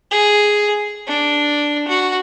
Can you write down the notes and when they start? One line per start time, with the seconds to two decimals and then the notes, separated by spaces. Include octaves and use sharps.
0.11 G#4
1.07 D4
1.88 F#4